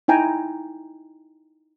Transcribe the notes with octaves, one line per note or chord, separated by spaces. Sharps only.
D#4 E4 G5 G#5 A#5